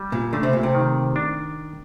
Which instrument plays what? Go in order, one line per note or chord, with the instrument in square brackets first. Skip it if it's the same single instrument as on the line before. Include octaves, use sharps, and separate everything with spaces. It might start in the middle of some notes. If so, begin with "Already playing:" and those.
Already playing: [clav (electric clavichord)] G3
[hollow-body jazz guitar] A#2
[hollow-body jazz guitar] D3 [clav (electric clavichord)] A3
[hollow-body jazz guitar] C3
A#2
C3
[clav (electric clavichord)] D#3
D4